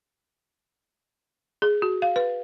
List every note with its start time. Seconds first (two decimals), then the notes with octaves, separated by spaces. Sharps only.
1.62 G#4
1.82 F#4
2.02 F5
2.16 B4